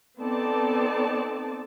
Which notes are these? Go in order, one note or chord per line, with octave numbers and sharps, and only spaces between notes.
B3 C4 D#4 A4 D5 A5